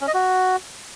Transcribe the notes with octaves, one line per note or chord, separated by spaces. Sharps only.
C#4
D#5
F#4